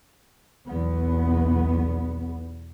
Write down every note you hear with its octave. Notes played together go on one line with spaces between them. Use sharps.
B1 E2 B3